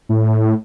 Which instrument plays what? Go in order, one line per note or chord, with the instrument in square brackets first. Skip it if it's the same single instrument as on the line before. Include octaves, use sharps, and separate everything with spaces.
[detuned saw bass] A2